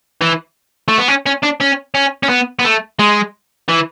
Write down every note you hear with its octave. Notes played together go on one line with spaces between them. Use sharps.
E3
A3
B3
C#4
C#4
D4
C#4
C#4
C#4
B3
B3
A3
G#3
E3